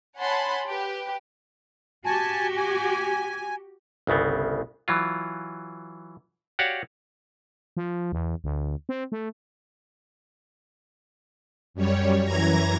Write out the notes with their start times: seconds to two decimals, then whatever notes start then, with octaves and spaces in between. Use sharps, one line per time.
0.19 C#5 F#5 G#5 A5 B5 C6
0.66 G4 B4
2.06 F#4 G4 G#5 A5
2.57 G#5
4.07 G1 C2 C#3 B3 C4
4.88 E3 F#3 F4
6.59 F#4 G4 C#5 D5 F5 F#5
7.77 F3
8.12 E2
8.44 D2
8.89 C4
9.12 A3
11.74 F#2 G3 C#5
12.24 F#2 E3 A#5 G#6 A#6